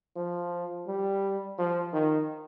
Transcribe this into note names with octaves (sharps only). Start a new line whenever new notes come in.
F3
G3
F3
D#3